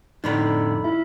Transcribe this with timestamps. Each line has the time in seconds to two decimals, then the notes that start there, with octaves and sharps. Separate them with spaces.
0.24 F2 A2 D3 D#4 B5
0.84 E4 E5